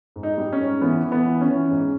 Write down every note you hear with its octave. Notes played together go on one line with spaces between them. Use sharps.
G#2
D#4
G3
C#4
G#2
E3 B3
E3
B3
E3
C#4
E3
G#2